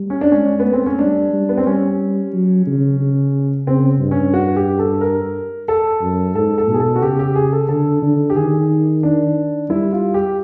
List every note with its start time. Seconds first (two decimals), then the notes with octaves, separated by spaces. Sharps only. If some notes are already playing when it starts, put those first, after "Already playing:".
Already playing: G3
0.10 C#4
0.21 D4
0.31 G#3 C#4
0.60 B3
0.66 A3
0.73 C4
0.86 C#4
0.99 G3 D4
1.33 G3
1.49 B3
1.58 C4
1.66 G3 C#4
2.33 F#3
2.67 C#3
3.00 C#3
3.67 C#3 C4
4.01 G2
4.11 C#4
4.34 F#4
4.56 G4
4.79 A4
5.01 A#4
5.68 A4
6.02 F#2
6.35 G#2 A4
6.58 A4
6.69 B2
6.74 G#4
6.80 A4
6.96 F#4
7.02 C#3 G4
7.19 G4
7.35 G#4
7.53 A4
7.68 D3 A4
8.02 D3
8.30 G4
8.36 D#3 G#4
9.03 D4
9.70 G3 E4
9.92 F4
10.14 G4